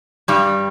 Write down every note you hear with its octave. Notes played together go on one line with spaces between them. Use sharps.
G2 G3